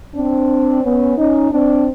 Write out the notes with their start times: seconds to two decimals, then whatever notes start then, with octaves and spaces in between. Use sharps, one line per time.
0.15 C4 D4
0.83 B3 C#4
1.16 C#4 D#4
1.51 C4 D4